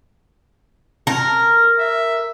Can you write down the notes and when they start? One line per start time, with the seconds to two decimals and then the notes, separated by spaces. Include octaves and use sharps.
1.07 A#4
1.79 E5